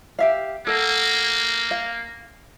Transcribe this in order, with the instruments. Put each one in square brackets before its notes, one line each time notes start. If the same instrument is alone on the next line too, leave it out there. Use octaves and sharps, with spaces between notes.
[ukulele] G4 E5 F5
[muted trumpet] A#3 [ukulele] A4 F#5
[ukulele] F5